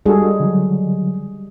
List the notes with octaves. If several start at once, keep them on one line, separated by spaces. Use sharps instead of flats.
G3 G#3 D4 F#4 G#4 A4
D3 F#3